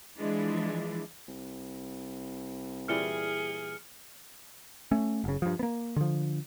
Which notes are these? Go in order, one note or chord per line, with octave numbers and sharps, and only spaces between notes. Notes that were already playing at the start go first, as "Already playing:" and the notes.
E3 F3 G#3 D4 E4
C2
A#2 E3 G3 G#4 F6 C#7 G7
A3 C#4
F#1 C#3
G2 F3
A#3 B3
D3 F3